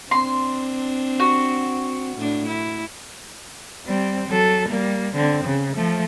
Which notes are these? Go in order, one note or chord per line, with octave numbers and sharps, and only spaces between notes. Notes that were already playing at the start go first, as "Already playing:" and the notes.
C4 D4 C6
F#4
A2 D4
E4
G3 C4
F#3 A4
G3 A#3
D3 C4
C#3
F3 A3